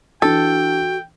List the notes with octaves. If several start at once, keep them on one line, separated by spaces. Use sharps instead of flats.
E3 D4 F#4 A4 G5